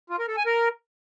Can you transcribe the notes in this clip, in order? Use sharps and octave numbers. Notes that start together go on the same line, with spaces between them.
F4
A#4
A4
G#5
A#4